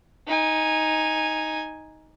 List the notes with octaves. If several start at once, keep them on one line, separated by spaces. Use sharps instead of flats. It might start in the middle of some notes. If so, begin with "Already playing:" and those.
D#4 G#5